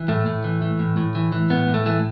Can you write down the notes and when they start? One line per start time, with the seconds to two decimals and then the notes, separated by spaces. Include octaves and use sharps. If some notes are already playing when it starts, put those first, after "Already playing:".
Already playing: E3
0.08 A2 A3
0.26 A2
0.44 E3
0.62 E3
0.79 A2
0.97 A2
1.15 E3
1.32 E3
1.50 A2 B3
1.68 A2
1.74 A3
1.86 E3 A3